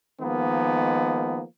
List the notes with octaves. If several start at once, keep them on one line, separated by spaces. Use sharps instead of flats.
D#3 F3 G#3 A#3 B3